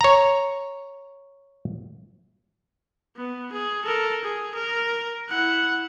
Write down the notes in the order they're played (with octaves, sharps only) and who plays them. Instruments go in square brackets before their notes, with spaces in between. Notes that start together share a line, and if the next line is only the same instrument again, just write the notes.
[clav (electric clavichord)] C#5 A#5
[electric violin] B3
G#4
A4 A#4
G#4
A#4
E4 F#5